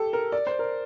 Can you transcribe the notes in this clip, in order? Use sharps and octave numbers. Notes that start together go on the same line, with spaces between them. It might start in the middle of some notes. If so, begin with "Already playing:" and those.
Already playing: G4 A4
A#4
D5
C5
A#4